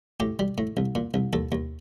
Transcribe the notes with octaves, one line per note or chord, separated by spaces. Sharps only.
A2 G4
G3
A2
C2
A#2
C2
D#2 A4
D#2